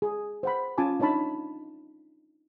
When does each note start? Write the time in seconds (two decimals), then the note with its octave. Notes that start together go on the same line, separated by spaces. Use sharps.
0.02 G#4
0.43 C5 F#5 B5
0.78 C#4 F4 G#5 A5 D6
1.00 D4 D#4 C#5 A5 B5